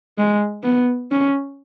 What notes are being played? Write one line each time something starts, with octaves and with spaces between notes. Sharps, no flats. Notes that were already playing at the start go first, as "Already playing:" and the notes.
G#3
B3
C#4